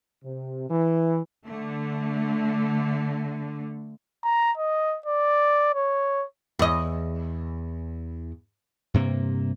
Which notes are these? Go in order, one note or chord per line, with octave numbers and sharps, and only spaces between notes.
C3
E3
D3 A3
A#5
D#5
D5
C#5
E2 D#5
G2 C3 A#3